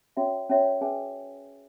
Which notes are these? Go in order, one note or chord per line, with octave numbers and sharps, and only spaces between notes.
C#4 F#4 C#5 E5
C#4 F#4 C#5 E5
C#4 G#4 B4 E5 G#5